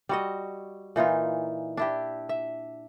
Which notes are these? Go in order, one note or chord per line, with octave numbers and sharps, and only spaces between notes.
G3 F#4 D#5
A#2 E3 D#4 F4
D4 E4 G4
E5